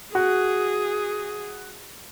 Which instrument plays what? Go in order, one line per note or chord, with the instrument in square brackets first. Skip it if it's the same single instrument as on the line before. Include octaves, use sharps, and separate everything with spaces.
[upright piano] F#4 [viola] G#4